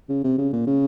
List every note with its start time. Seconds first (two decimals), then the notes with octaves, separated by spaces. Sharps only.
0.09 C#3
0.24 C3
0.38 C#3
0.53 A#2
0.67 C#3